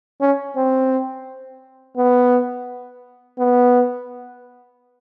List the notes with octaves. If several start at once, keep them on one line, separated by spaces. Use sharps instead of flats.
C#4
C4
B3
B3